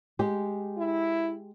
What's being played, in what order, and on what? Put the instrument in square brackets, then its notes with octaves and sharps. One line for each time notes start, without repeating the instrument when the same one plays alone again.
[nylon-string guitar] G#3 G4
[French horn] E4